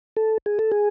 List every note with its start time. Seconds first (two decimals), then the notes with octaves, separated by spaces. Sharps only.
0.17 A4
0.46 G#4
0.59 A4
0.72 G#4